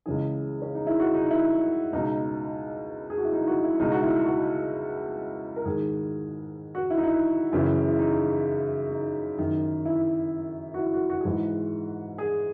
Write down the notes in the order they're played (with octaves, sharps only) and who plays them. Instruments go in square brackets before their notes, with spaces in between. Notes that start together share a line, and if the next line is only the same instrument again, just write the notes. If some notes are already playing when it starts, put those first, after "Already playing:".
[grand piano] C#2 C#3 E3 G#4
C#4
D#4
E4
F#4
D#4
E4
C#2 B2 D#4
G#4
F#4
E4
D#4
E4
F#4
E4
C#2 B2 D#4
F#4
E4
F#4
A#4
G#2 D#3 G#4
F#4
E4
D#4
E4
F#2 C#3 E3
E4
D#4
D#4
F#2 D#3
E4
F#4
E4
F#4
F#4
G#4
G#2 E3 F#4
G#4